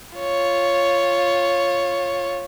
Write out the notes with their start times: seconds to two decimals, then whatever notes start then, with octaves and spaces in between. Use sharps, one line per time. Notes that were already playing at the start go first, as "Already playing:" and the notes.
0.17 F4 C#5